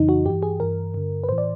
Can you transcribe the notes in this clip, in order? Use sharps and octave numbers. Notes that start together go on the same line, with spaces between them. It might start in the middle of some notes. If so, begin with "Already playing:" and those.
Already playing: F2 C#3 E3 D#4
F#4
G2 E3 G4
G#4
G2 E3 A#4
G2 D3
B4
A2 E3 C5
D5